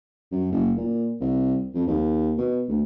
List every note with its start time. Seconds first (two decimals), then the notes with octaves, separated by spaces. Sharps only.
0.32 F#2
0.52 F#1
0.77 A#2
1.21 C2
1.75 F2
1.87 D#2
2.38 B2
2.69 D2